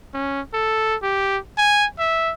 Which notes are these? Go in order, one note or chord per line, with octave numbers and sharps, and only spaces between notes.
C#4
A4
G4
G#5
E5